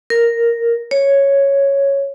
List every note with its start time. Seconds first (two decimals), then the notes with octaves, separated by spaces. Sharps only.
0.10 A#4
0.91 C#5